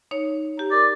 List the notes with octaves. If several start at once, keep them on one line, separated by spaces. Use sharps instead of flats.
D#4 C#5
G4 A#5
A#4 D5